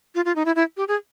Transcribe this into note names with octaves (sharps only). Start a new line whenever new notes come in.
F4
F4
D#4
E4
E4
G4
G#4